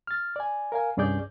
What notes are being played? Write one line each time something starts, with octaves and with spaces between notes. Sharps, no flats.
F6 A6
D5 G#5
A#4 F5 G#5
C2 G2 C#4 G#4 D5 G6